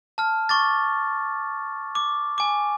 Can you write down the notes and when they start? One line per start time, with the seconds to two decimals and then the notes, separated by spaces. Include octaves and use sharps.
0.18 A5 F6
0.49 C#6 D6 A6
1.95 D6
2.38 G#5 D6